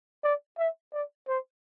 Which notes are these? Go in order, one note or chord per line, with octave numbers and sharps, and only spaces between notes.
D5
E5
D5
C5